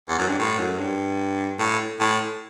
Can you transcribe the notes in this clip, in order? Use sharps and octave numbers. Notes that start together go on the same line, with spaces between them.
E2
F#2
G2
A2
F#2
G2
A2
A2